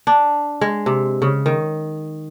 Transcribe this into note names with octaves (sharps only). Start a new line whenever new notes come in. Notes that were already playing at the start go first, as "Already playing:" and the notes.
D4
G#3
C3
C#3
D#3